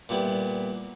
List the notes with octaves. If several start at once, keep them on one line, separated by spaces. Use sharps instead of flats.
A#2 G3 B3 E4